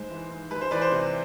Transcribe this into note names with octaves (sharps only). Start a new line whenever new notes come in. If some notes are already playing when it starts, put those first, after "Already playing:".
Already playing: G#2 G#3 C5
E3
G#2
G#3 B4
C5
E3 B4 D5
C5
C3